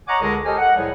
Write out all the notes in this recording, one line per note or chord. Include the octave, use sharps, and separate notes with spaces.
C#5 D#5 F#5 G#5 A#5 D6
C#2 D3 G#3 G#4 A#4 D#5
G4 A4 A#4 C5 D#5 G#5
F#5
C2 A2 F3 G3 G#4 C#5